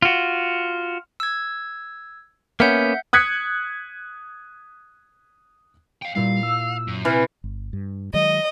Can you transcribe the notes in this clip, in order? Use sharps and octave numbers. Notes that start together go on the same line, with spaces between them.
F4 F#4
E6 G#6
A#3 B3 C#4 E5 F#5 G6
D#6 F#6 G#6 B6 C#7
F5 G5
A#2 G3 E4 F5 C7
E6
F#2
C3 E3 F6
G1
G2
D#3 F#3 G#3 D#5